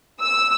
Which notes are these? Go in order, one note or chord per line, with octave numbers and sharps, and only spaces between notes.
E6